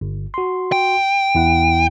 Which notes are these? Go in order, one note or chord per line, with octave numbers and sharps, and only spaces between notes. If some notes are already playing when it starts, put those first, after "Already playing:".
G1
F#4 C6
G5
E2 E4 F#5